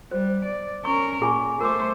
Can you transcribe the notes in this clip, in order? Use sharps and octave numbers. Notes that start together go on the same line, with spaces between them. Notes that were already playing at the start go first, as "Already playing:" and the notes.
G3 C5
D5
C#4 A#4 C#6
A#2 G#4 G#5 C#6
A3 A#4 C5 D6